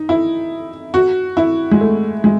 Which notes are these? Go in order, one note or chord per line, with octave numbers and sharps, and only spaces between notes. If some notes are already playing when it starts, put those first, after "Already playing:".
Already playing: D#4
E4
F#4
E4
G#3
A3
G#3